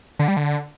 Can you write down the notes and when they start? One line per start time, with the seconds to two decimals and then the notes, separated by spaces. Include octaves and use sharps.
0.19 D3
0.28 G3
0.37 D3